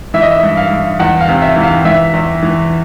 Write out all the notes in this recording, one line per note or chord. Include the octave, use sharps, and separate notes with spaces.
E3 E5
D#5
E5
G2
F5
G2
E2 F#5
F5
C3
E5
E3
F5
E3 E5
E2
E3